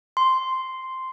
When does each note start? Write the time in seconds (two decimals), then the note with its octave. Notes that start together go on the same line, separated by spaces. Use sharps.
0.17 C6